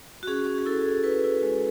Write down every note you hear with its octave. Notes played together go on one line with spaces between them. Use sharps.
F#4
C#4 G#4
C#4
G#4
E4 A4
C#4
E4 B4
E4
G#3